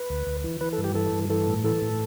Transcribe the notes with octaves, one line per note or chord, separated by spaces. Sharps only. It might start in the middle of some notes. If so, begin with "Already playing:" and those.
Already playing: B4
D2
D2
E3
E3 B4
A4
G2
G4
E3 A4
G2
E3 A4
A2
E3 A4
A2